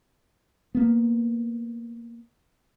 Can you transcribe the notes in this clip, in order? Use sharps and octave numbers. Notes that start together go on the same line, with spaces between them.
A#3 B3